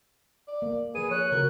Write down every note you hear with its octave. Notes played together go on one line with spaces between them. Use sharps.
D5
A#3
F3 G#4 B4 D#7
C#5 F#6
C#3 F#4 A#4